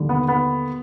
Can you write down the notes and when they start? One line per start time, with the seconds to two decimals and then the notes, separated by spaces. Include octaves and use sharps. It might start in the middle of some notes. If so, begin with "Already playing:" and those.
Already playing: D#2 D3 G3
0.09 B3
0.28 B3